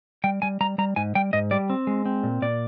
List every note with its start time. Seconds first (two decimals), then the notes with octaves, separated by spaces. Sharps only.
0.24 G3 G5
0.42 G3 G#5
0.61 G3 A#5
0.78 G3 A#5
0.96 G#2 G#5
1.15 G3 G5
1.33 G#2 D#5
1.51 G3 D5
1.70 C4
1.87 G#3
2.06 C4
2.23 A#2
2.42 A#2 D5